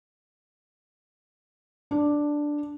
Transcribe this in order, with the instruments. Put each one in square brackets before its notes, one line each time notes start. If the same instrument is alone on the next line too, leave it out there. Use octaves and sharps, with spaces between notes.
[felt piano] D4